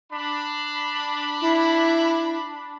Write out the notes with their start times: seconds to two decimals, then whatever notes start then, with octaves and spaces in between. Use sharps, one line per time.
0.11 D4 B5
1.40 E4